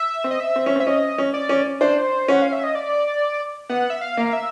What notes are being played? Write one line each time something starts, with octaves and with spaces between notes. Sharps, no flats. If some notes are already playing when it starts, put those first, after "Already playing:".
Already playing: E5
C4
D#5
E5
C4
C#4
C4
E5
C#4 D#5
C#4
D5
C#4
D4 C5
C#4 F#5
F5
E5
D#5
D5
B3 F#5
E5
F5
A#3
F5
E5